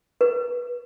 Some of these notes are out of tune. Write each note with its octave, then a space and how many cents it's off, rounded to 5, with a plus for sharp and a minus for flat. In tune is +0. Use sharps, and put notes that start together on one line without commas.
B4 -25